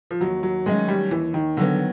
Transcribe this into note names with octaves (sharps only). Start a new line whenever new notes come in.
F3
D#2 F#3
F#3
D#3 F#3 G#3 A3 C#4
G3
D#2 E3
D#3
D3 D#3 F#3 B3